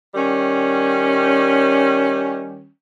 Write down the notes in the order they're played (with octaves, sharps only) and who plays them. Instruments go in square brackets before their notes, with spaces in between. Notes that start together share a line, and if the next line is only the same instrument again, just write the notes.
[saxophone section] D#3 G3 C#4